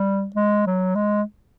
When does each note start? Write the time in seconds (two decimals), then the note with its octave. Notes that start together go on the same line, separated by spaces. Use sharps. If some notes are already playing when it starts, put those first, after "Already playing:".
Already playing: G3
0.36 G#3
0.67 F#3
0.95 G#3